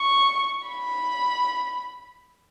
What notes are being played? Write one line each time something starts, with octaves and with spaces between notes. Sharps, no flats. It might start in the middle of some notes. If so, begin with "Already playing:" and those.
Already playing: C#6
B5